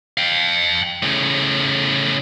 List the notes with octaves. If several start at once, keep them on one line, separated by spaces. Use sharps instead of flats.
F5 G5
A2 C#3